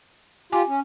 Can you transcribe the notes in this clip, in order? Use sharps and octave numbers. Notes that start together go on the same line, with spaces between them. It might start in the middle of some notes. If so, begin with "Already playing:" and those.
F4 G4 G#5 D6
C#4